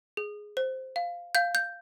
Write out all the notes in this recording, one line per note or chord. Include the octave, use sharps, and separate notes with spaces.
G#4
C5
F5
F5 G6
G6